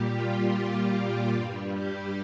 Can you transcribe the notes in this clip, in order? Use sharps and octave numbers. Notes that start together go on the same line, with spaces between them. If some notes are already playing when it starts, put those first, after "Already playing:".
Already playing: A#2 G3 G4
F4
F4
G2 G3
G4